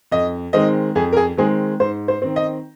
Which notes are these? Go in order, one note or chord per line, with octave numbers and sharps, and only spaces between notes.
F2 D#5
D#3 G#3 C4 D#5
F2 G#4
A#4
G#4
D#3 G#3 C4 G#4
G#2 C5
C5
D#3 C4
D#5